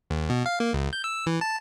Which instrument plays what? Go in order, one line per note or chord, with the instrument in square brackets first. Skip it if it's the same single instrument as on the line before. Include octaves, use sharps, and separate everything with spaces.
[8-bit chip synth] D#2
B2
F5
A#3
C#2
G6
E6
E3
A5